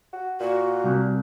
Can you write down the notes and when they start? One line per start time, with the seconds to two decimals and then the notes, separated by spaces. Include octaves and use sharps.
0.13 F#4
0.40 A#2 F#4
0.84 C2